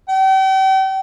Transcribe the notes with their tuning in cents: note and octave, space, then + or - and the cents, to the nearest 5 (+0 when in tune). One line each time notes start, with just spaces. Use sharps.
G5 -40